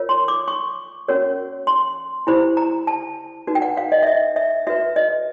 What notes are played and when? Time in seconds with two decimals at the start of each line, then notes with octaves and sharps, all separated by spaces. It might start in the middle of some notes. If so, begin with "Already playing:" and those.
Already playing: F4 A#4 C#5
0.09 C6
0.28 D6
0.48 C#6
1.08 C#4 F#4 A#4 C#5
1.67 C6
2.27 E4 G4 C5 B5
2.57 A#5
2.87 A5
3.47 D#4 F#4 B4
3.55 G5
3.62 F#5
3.77 F5
3.92 D#5
4.03 E5
4.07 D#5
4.36 E5
4.67 F#4 B4 E5
4.96 D#5